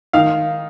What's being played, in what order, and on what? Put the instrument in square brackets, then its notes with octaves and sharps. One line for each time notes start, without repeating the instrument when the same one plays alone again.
[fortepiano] D#3 [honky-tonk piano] F5